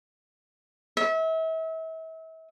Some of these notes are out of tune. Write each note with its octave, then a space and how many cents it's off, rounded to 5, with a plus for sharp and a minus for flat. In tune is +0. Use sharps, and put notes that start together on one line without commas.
E5 -35